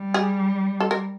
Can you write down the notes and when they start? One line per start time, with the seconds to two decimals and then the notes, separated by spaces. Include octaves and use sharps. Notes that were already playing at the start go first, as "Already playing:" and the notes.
Already playing: G3
0.14 G#4
0.80 A4
0.91 A#4